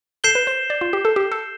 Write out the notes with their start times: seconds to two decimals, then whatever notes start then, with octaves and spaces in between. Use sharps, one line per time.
0.24 A4 G6 C7 E7 G7
0.35 B4
0.47 C5
0.70 D5
0.81 F4
0.93 G4
1.05 A4
1.16 G4
1.32 A4